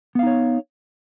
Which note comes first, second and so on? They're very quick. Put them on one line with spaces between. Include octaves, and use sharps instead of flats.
B3 F5 D#4 C#5